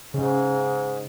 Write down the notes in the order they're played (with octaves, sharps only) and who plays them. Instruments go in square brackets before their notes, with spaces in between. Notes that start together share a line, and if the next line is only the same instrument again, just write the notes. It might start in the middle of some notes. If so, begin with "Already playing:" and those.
[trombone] G#2 [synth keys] C#3